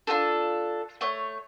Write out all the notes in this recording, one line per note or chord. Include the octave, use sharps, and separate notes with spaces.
D4 F4 G4 A4
A3 C#5